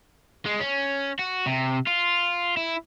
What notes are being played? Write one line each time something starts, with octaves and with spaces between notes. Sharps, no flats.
G#3
C#4
F#4
C3
F4
E4